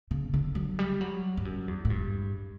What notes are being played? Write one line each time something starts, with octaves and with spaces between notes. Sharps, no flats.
C#3
D3
F#3
G3
F#3
G2
F#2
E2
A2
G2